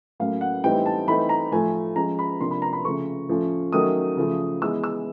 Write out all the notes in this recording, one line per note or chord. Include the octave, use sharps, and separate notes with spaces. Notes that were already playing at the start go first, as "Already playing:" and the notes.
A2 F#3 A#3 C#4 F5
F#5
A2 E3 G3 C4 D#4 G5
A5
E3 A3 C4 D#4 B5
A#5
A2 F3 A3 G#5
F3 G#3 C#4 A#5
B5
C3 F3 A#3 D4 C6
B5
A#5
B5
C#3 F3 A3 C#6
A2 F3 A3 C#4
D#3 F#3 A3 C#4 D#6
C#3 F3 A3
E3 G#3 B3 E6
E6